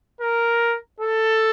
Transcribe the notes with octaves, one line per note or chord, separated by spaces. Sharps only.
A#4
A4